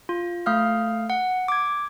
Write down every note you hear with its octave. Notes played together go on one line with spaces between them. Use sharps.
F4
A3 F5 F6
F#5
D6 G#6